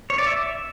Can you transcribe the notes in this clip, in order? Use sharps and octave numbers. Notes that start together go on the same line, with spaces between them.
C#5
D5
E5